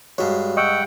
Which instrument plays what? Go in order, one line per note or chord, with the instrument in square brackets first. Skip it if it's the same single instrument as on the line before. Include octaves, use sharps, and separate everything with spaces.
[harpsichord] G2 G#3 [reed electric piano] F#4 C#5
[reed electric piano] D#5 C#6 E6 [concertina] F#5 G5